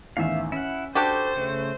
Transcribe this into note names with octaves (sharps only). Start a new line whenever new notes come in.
A1 E2 D#3 E5 F5
C#4 E4 F#5
D4 F#4 G4 A4 C5 A5 C#6
C#3 A3